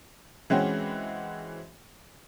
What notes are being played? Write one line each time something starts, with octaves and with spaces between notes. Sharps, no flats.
E3 G#3 C4 C#4 F#4